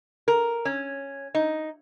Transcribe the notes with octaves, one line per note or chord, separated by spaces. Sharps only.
A#4
C#4
D#4